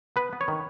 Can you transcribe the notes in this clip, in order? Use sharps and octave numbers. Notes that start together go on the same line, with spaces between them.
B3 B4
B3
C#5
D#3